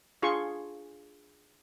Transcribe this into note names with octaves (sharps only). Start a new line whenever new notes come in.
D4 F4 G#4 C6 C#6